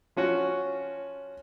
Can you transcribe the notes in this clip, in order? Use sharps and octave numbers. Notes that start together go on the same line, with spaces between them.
F3 C#4 F#4